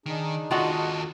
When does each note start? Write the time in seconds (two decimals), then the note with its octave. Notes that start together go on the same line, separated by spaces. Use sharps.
0.06 D#3 D4 D#4 G#4
0.51 D#2 F4 F#4 A4 D#5 F#5 A5